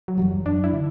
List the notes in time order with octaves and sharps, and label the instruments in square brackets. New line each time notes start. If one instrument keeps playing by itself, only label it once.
[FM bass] F#3
[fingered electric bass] F#2 E3 G3
[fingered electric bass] F#2 [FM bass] D4
[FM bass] E4
[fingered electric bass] D3